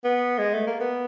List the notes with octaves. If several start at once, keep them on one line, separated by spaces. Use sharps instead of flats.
B3
G#3
A3
A#3
B3